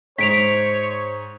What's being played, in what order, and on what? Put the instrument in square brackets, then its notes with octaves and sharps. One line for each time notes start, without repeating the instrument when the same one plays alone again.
[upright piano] G#2 [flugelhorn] C5 [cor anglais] C#5 [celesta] B6 D7 F7